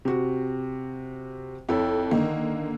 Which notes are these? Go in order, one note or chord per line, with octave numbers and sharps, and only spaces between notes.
C3 F#4
F2 E4 A4 C#5
D3 D#3 A#3